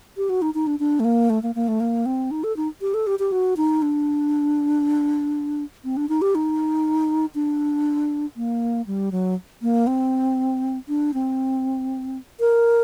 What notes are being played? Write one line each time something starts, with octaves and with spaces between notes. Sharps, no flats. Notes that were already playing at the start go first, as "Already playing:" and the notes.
G4
F#4
D#4
D#4
D4
D4
A3
A#3
A3
A#3
A#3
A3
A#3
C4
D#4
A4
D#4
G4
A4
G4
G4
F#4
D#4
D4
C4
D4
D#4
G4
D#4
D4
A#3
G3
F#3
A#3
C4
D4
C4
A#4